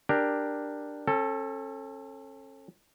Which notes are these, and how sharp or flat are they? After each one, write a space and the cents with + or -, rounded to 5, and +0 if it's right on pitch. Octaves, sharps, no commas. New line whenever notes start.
D4 +5 G4 +0 A#4 +0
C#4 -40 A4 +5